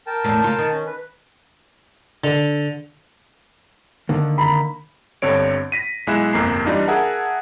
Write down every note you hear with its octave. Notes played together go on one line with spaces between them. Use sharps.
A#4 G5 A5
E2 A2 A3
C#3 F4
D#3
C#4
B4
D3
D3 D#3 A#3
A#5 B5
G1 G2 D3 C4 C#5 D7
A#6 B6 D#7
B1 G#3 E4 G#5 F#6 E7
G1 C2 F2 A#3 A#5 C7
E3 G3 D4 D#4 F4
G#4 A#4 E5 F#5 A5 A#5